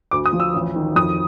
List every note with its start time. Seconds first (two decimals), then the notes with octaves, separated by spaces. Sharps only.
0.11 D2 D6
0.26 D#6
0.33 F3
0.40 E6
0.54 A1
0.76 D#3
0.96 F2 D#6